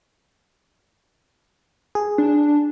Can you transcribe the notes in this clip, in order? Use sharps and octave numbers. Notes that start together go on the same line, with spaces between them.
G#4
D4